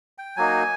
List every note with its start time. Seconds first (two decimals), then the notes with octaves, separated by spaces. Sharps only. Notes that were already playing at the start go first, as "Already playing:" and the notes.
0.18 G5
0.36 F#3 A#3 D#4 G#5